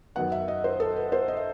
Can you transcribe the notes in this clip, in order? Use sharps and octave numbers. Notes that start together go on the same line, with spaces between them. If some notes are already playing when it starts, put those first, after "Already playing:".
F#2 D#3 F#3 B3 F#5
E5
D#5
C5
A4
B4
C5
D#5
E5